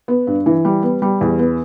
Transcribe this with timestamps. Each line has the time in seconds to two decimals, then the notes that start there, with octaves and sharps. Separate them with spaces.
0.08 B3
0.27 G2
0.46 E3
0.65 G3
0.83 B3
1.02 G3
1.21 E2
1.39 B3